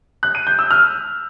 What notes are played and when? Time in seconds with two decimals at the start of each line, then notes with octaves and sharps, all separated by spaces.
0.23 F#6
0.35 D#7
0.47 G6
0.59 E6
0.71 F6